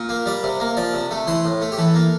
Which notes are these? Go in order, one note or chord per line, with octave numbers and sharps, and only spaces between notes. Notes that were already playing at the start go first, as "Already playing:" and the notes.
Already playing: A#2
A#3
G3 D5
C3
A#3
F3 D5
C3
A3
E3 C5
A2
A3
G4
E3 A4
A#3